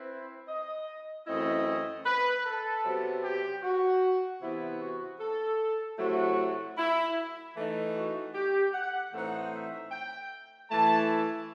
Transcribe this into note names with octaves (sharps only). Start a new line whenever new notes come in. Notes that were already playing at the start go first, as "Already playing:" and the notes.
Already playing: C4 E4 B4
D#5
F#2 E3 A3 C4 E4 D#5
B4
A4
C3 F#3 B3
G4
F#4
C3 E3 B3 E4
F#4
A4
C3 F#3 A3 E4 F#4
E4
E3 A3 D#4
F#4
G4
F#5
A2 E3 A3 C4 D#4 F#5
E5
G5
E3 A3 E4 A5